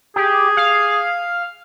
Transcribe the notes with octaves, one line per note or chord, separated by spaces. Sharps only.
G4 G#4
F5